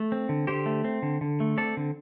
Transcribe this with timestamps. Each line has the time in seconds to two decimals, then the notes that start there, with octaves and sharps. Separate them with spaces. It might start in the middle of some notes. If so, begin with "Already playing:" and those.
Already playing: A3
0.12 C4
0.29 D3
0.47 D3 G4 C5
0.66 A3
0.85 C4
1.02 D3
1.21 D3
1.40 A3
1.57 C4 A4 D5
1.77 D3